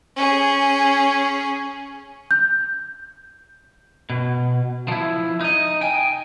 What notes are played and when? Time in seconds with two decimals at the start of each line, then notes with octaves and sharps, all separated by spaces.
0.16 C#4 G#4
2.31 G6
4.10 B2
4.88 F3 E4
5.41 D#4 D#5
5.81 G5 G#5